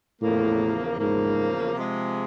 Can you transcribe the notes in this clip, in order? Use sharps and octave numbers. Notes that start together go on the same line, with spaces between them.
E2 A2 C#3 F3 A#3
E2 G#2 C#3 F3 A#3
C3 F3 G#3